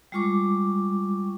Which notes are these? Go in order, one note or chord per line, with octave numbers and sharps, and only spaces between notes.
G3 G#3 F4 C#6 D6